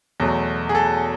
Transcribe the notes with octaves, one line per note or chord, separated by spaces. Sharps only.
E2 B2 F#3 A3
G#4
A4